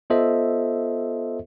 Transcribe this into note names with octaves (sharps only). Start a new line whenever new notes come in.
B3 F4 A4 C5 D#5 E5